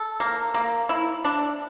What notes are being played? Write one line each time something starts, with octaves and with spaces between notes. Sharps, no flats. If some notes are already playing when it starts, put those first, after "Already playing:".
Already playing: A4
A#3
A#3
E4
D4